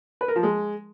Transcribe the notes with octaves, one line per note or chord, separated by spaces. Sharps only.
B4
A#4
F3
G#3